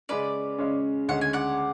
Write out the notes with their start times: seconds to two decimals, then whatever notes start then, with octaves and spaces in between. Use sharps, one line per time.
0.09 C#3 G#3 C#4 B4 D5
0.58 C#3 G#3 C#4
1.08 D2 C#3 G#3 C#4 F#5
1.21 G#5
1.33 D5 F#5